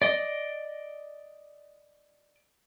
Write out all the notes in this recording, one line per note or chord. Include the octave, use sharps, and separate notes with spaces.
D5 D#5